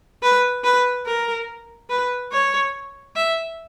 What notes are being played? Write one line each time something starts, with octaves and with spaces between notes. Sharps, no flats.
B4
B4
A#4
B4
C#5
E5